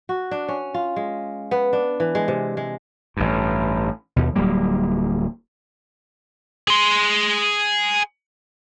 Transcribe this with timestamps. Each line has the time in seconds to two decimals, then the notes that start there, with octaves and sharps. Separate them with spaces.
0.09 F#4
0.31 D4
0.48 C#4
0.74 F4
0.96 G#3
1.51 B3
1.73 D4
2.00 E3
2.15 G#3
2.28 C3
2.57 G#3
3.17 A1 G2
4.16 D#2 B2
4.36 D1 F#3 G3 A#3
6.68 G#4 C6